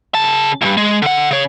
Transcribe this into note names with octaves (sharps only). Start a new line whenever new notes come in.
C#3 A5
C#2 G2
G#3
D3 F#5
C#3 C#5